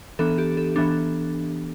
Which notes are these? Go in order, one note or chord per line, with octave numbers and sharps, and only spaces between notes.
E3 B3 D4 A4
G4
A4
E3 B3 D4